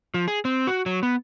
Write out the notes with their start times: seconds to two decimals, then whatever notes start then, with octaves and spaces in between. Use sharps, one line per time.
0.14 F3
0.28 G#4
0.45 C4
0.67 F#4
0.86 F#3
1.03 B3